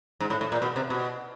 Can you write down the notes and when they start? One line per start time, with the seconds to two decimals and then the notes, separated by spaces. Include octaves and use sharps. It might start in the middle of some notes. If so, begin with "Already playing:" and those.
0.20 G#2
0.30 A2
0.41 A2
0.52 A#2
0.62 B2
0.76 C3
0.90 B2